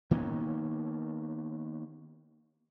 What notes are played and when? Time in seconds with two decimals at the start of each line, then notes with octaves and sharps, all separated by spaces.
0.11 D#3 A#3 B3 C#4